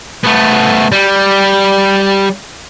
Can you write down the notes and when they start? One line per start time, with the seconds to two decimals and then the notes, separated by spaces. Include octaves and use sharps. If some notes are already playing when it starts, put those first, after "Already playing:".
0.24 A3 B3
0.92 G3